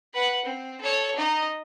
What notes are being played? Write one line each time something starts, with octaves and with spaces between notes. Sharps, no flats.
B4 F#5
C4
A4 C#5
D#4 D#5